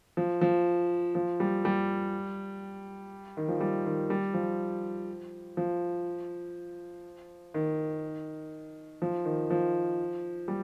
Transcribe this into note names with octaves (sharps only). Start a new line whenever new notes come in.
F3
F3
F3
G3
G3
D#3
F3
G3
D#3
G3
F3
F3
D#3
F3
D#3
F3
G3